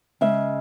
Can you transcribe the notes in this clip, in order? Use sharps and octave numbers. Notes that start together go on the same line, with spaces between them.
C#3 G#3 E5